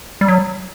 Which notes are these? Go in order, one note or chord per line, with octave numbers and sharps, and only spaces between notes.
G3
F#3